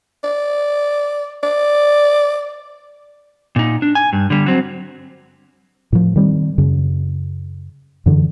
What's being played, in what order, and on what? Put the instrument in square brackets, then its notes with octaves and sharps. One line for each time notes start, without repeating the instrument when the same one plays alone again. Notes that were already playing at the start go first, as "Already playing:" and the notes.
[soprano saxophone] D5
D5
[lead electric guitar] A#2 D#4
D4
G#5
G2
D3 G3
F#3 C4
[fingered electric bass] A2 F3
D#3 G3 C4
F#2 C#3
F#2 D3 E3